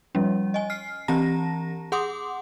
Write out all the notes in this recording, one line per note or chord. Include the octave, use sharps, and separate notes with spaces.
F3 G3 C#4
D#5 G#5
F6 C7
E3 C4 G4 A5 A#5 A#6
G#4 F#5 C6 D6 D#6